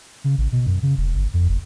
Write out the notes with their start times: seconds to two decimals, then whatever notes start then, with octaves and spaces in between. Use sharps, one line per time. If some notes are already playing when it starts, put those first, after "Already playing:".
0.24 C#3
0.38 A1
0.52 B2
0.67 F#2
0.83 C#3
0.97 E1
1.15 G1
1.34 F2
1.49 F#1